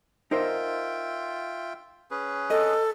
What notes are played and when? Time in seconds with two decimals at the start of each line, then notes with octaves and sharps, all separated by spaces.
0.31 D#4 F4 A#4 C5 E5 G5
2.11 C#4 G#4 B4
2.50 A4 D#5